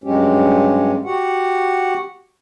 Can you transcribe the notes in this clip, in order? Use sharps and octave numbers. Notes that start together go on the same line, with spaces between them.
G2 F#3 G#3 C#4 G4
F#4 G4 F#5